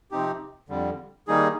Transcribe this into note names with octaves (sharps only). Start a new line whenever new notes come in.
C3 F3 C4 D#4 G4
F2 D3 G3
D#3 G3 A#3 D#4 G#4